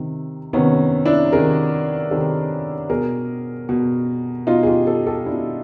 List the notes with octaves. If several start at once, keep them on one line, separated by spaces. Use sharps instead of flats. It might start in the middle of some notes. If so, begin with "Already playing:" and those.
Already playing: C3 D#3
C3 D#3 B3 C#4
D4 E4
C3 D#3 G#4 A#4
C3 D#3 G4 A4
B2 G#4 A#4
B2
B2 D#4 F4
G#4
F4 G4
G4 A4
G4 A4
B2 D4 E4